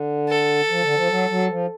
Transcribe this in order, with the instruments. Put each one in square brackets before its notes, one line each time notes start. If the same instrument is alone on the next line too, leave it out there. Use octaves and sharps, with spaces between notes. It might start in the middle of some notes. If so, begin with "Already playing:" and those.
Already playing: [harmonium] D3
[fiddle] A4
[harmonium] F3
D3
F3
F#3
F#3
F3